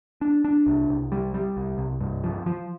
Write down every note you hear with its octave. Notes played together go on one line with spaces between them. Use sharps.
D4
D4
C2
C2
G3
G3
C2
C2
G2
F3
F3